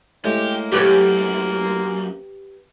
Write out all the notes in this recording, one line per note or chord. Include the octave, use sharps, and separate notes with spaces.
A2 G#3 A#3 G4
F#2 G4 B4 C#5